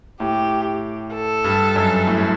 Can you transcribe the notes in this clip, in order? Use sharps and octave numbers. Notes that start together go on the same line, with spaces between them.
A2 G4
A4
G2
F#2
A2